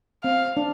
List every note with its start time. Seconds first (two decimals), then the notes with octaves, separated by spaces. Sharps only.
0.24 C4 F5
0.57 D4